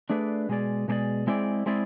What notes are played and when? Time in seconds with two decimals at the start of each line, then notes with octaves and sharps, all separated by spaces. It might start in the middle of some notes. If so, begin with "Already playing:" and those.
0.10 A3 D4 G#4 B4 D5
0.49 B2 G#3 D4 G#4 D5
0.88 B2 G#3 D4 G#4 D5
1.27 G#3 C4 E4 G#4 D5
1.66 G#3 C4 E4 G#4 D5